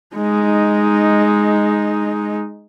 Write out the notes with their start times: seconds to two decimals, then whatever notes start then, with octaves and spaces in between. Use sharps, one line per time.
0.16 G#3 D#4